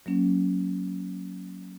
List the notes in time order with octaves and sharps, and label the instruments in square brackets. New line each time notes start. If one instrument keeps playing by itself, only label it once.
[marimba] F#3 A#3 C#4